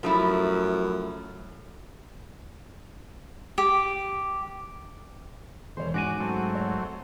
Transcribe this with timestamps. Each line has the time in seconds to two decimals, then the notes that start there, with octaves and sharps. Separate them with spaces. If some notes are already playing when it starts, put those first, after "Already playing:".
0.03 F#2 F3 A3 E4
3.58 G4
5.77 E1 C5 C#5
5.94 G#2 C#4 F#4 F#5 G#5 D6
6.20 F#3 A3 C4
6.55 C#5